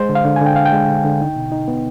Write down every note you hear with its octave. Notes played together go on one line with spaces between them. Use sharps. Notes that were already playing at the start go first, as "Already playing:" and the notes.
Already playing: G#3 C5
D3
F5
D3
G#5
D3 G5
D4 F5
G5
G#3
D3
D3
D#4
B2
D#4
B3